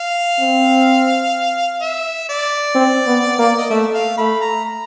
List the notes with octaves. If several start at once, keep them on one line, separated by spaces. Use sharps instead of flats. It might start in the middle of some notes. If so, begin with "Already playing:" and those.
Already playing: F5
C4
E5
D5
C4
B3
A#3
D#5
A3 E5
F5
A3 B5
A#5
A#5